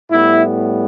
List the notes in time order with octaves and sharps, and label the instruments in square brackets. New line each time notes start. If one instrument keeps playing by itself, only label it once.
[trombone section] A2 G3 B3 E4